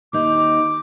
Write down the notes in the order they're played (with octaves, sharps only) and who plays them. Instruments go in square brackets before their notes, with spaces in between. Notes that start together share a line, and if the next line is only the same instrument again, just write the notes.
[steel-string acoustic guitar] D#2 D#4 [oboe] D6